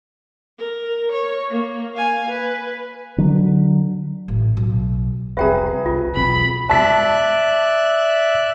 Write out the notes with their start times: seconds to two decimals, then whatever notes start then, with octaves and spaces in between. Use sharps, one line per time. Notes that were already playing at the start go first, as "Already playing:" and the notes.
0.58 A#4
1.12 C#5
1.49 A#3
1.94 F5 G#5
2.28 B4
3.18 D3 F#3
4.28 A1
4.57 B1
5.37 F1 C2 C4 G#4 B4 E5 G5 A#5
5.86 C2 F4
6.15 E1 B1 C4 B5
6.70 D5 E5 A5 F#6 B6